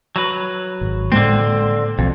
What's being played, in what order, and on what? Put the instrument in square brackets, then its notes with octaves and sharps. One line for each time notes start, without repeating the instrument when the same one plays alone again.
[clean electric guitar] F#3 B4
[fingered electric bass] G#1
[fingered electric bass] A2 G#3 A#3 [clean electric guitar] D3 C4
[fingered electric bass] B1 [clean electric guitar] F2